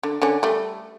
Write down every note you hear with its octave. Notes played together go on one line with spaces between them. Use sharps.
D3
D3 C#4
G3 A3